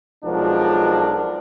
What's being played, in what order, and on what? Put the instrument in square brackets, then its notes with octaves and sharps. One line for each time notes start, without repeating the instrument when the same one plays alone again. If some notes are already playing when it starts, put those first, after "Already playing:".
[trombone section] B1 F3 G#3 D4 F#4 A#4